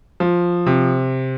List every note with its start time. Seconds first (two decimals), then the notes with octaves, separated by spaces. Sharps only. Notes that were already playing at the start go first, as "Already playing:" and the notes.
0.20 F3
0.66 C3